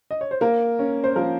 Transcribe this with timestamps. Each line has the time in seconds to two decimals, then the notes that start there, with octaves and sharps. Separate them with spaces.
0.11 D#5
0.21 C#5
0.31 C5
0.41 A#3 A#4
0.79 C#4
1.04 C5
1.16 F3 A#3 A#4